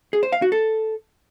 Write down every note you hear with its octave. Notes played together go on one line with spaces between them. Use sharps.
G#4
C5
F5
F#4
A4